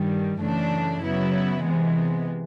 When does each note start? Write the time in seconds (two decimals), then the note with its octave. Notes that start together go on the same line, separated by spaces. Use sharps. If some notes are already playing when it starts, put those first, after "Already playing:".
Already playing: G2 D#3 G3
0.41 F#2 C#3 E3 A3 D4
1.03 C#3 F#3 B3 E4
1.64 C3 E3 G#3 B3